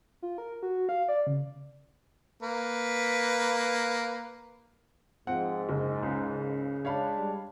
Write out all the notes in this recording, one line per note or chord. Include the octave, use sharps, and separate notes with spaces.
F4
A#4
F#4
F5
D5
C#3
A#3 B4
G#2 F3 C4 F#5
F#1
C#2 C#3
G#3 D4 C#5 F5 B5
G3